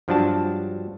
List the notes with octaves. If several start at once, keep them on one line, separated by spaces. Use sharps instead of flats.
G2 F3 F#3 D4 F#4 A5